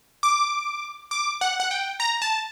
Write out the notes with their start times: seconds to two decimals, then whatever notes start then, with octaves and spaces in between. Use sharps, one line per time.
0.23 D6
1.11 D6
1.41 F#5
1.60 F#5
1.71 G5
2.00 A#5
2.22 A5